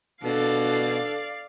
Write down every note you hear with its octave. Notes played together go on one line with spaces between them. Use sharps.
B2 D4 A4 D5 F5